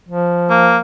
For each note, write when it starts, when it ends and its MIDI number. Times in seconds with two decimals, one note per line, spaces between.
0.09 0.79 53
0.50 0.78 58